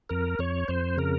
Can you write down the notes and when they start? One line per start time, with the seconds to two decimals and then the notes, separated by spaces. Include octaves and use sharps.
0.09 F2 A#4
0.39 F2 C#5
0.68 F2 C5
0.97 C#3 A#4